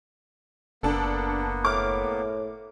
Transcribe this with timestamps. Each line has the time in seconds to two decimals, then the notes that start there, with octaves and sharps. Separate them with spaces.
0.83 F#1 A#3 B3 D4 A4
1.65 A2 D6 F6